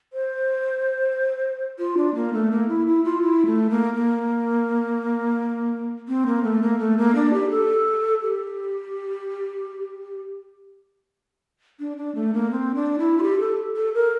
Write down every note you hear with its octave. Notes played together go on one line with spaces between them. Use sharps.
C5
F4
D4
A#3
A3
A#3
E4
E4
F4
E4
A3
A#3
A#3
C4
A#3
A3
A#3
A3
A#3
D4
G4
A4
G4
D4
D4
A3
A#3
C4
D4
E4
F4
G4
A4
A4
A#4